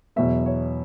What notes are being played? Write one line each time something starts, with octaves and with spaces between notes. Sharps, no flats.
E2 B2 F#3 B3 E5
C#5